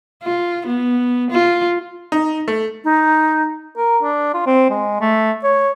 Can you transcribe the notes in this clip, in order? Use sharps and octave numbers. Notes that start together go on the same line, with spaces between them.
F4
B3
F4
D#4
A3
D#4
A#4
D4
F4
C4
G#3
A3
C#5